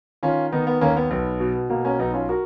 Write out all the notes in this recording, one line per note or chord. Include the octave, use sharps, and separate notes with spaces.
D#3 C#4 F4
D#3 B3 D#4
B3
D#2 A#3 C#4
B3
B1 B3
B2
B2 A#3
A#3 C#4
B1 B3 D#4
C#4 F4
F#4 A#4